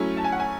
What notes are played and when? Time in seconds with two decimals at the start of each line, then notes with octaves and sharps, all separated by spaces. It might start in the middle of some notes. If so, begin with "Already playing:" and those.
Already playing: F#3 A3 C#4 E4
0.17 A5
0.24 G#5
0.32 F#5
0.40 G#5